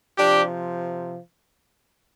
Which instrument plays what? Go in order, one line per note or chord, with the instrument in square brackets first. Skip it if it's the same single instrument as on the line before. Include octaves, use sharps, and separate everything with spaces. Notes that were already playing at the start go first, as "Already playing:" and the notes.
[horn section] C3 F3 D4 G4